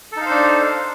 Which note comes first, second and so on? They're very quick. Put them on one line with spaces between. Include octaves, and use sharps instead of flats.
A4 D#4 F5 C5 D4